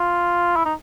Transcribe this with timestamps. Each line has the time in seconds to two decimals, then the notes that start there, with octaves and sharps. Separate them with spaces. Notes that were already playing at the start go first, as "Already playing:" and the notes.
Already playing: F4
0.56 E4
0.65 D#4